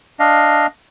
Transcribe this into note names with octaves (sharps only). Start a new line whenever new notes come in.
D4 D#5 F5